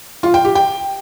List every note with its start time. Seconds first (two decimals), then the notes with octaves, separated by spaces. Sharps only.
0.23 F4
0.34 G5
0.45 G4
0.55 G5